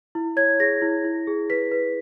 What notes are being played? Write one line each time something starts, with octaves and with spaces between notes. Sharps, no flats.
E4
C#5 G#6
G#4 A#6
E4
E4
G#4
B4 B6
B4